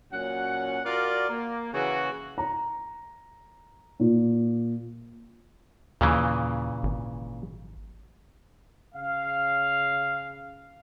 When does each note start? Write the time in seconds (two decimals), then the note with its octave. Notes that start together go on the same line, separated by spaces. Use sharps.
0.12 A#2 F#3 C#4 F#5
0.85 F4 F#4 A#4 D5
1.30 A#3
1.73 C#3 E3 F#4
2.38 A#5
4.00 A#2
6.01 D#2 A#2 C#3 E3
6.83 G#1
8.95 C#3 F5